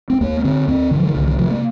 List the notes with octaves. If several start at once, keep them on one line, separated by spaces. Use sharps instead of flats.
C4
D#2 A#3
A#3
D3 C4
D#2 C4
D3 D#3
F3
D#3
C2 D3
D#3
C3 F3
A#3